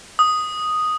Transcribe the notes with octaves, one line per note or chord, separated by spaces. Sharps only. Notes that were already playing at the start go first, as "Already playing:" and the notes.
D#6